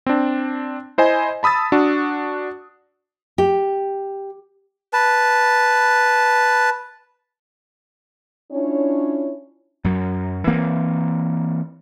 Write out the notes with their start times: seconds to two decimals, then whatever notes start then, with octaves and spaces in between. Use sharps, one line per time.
0.06 C4 D4
0.98 E4 C5 D#5 G#5
1.43 A5 B5 D#6 E6 A6
1.72 D4 F#4
3.38 G4
4.93 B4 A5
8.51 C#4 D4 E4 F4 C#5
9.84 F#2 F#3
10.47 E3 A#3 C4